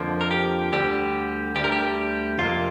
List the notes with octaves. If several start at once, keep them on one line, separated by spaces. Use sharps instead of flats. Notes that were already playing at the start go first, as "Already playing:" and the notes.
Already playing: F2 D3 F3 A#3
A#4
G4
D2 D3 G3 G4
D2 D3 G3 G4
A#4
G4
F2 C3 A#3 F4